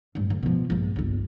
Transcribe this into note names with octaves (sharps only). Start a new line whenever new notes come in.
D1 G2
D2
B2 F3
A#1 G2
G1 C#2